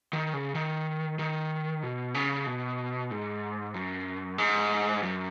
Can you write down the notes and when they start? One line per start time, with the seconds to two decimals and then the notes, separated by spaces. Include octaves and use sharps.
0.13 D#3
0.34 C#3
0.55 D#3
1.19 D#3
1.83 B2
2.14 C#3
2.46 B2
3.11 G#2
3.74 F#2
4.38 G#2
5.03 F#2